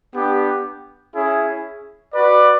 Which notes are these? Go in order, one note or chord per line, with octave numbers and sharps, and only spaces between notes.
B3 D4 G4
C#4 E4 G#4
F#4 B4 D5